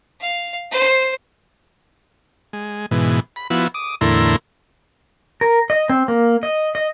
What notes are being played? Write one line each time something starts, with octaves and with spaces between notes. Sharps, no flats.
F5
C5
G#3
G#2 B2 E3
B5
F3 B3 E4 F#4
D6 D#6
E2 A2 D3 E4 A#4 C6
A#4
D#5
C4
A#3
D#5
D#5